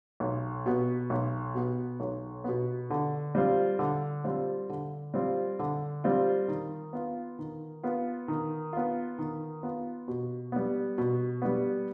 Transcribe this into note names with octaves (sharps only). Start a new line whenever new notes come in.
B1
B2 B3
B1
B2 B3
B1
B2 B3
D3
G3 C4 F4
D3
G3 C4 F4
D3
G3 C4 F4
D3
G3 C4 F4
D#3
B3 F4
D#3
B3 F4
D#3
B3 F4
D#3
B3 F4
B2
G3 B3
B2
G3 B3